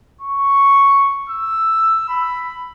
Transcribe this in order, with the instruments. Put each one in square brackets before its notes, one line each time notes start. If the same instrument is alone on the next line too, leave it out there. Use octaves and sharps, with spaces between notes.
[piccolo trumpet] C#6
E6
B5